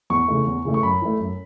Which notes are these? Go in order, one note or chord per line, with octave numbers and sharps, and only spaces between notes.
E2 C#6
C#3 E3 A3
E2
C#3 E3 A3
C#6
F#2 B5
E3 A3
F#2